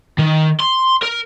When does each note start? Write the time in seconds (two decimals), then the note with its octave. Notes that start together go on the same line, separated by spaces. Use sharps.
0.18 D#3
0.60 C6
1.03 A#4